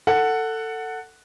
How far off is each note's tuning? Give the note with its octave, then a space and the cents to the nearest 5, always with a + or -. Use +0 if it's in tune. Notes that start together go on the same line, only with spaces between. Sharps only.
A4 +20 F#5 +0